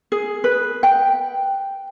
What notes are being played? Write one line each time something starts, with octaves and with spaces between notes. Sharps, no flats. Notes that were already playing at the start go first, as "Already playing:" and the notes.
G#4
B4
G5